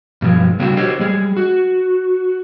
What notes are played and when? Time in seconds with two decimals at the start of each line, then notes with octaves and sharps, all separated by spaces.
0.22 G2 B2 F3 F#3 G#3
0.60 C#3 G3 C4 D4 F#4 A4
0.77 F#4 G4 A4 C5 C#5 D#5
0.99 G3 G#3 G#4
1.37 F#4